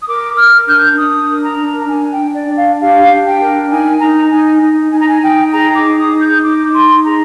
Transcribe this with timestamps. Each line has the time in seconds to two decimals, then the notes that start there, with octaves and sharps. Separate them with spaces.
0.02 D#6
0.07 A#4 D6
0.37 A#4 F6
0.68 D4 G6
0.98 D4 D#6
1.29 A#4
1.44 A#5
1.59 D4
1.89 D4 G#5
2.11 G5
2.19 D4
2.34 D5
2.50 D4
2.57 F5
2.80 G4 F5
3.10 D4
3.26 G5
3.41 A#4
3.71 D#4 G#5
4.01 D#4 A#5
4.31 D#4 G#5
4.62 D#4
4.92 D#4 G#5
5.00 A#5
5.09 G#5
5.23 D#4 G5
5.53 G#4 A#5
5.75 D6
5.83 D#4
5.98 D#6
6.14 D#4
6.21 G6
6.43 D#4 D6
6.74 D#4 C6
7.04 G#4 A#5